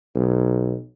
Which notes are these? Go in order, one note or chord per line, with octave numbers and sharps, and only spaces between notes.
B1